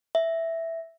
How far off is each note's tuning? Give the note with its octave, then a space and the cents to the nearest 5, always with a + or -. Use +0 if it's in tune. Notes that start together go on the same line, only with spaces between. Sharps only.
E5 +0